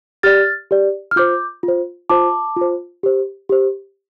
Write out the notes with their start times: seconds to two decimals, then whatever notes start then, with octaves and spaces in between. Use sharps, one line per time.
0.23 G4 D5 F6 A6
0.71 G4 D5
1.11 F6
1.16 F4 C5 D6 G6
1.63 F4
1.68 C5
2.10 F4 C5 A5 D6
2.56 F4 C5
3.03 G4 C5
3.49 G4 C5